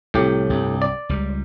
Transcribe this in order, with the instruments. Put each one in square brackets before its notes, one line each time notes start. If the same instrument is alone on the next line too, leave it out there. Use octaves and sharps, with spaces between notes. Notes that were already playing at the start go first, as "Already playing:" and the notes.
[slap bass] C2 [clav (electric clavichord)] A2 G4
[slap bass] C2 G2
[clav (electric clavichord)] D5
[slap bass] C#2 G3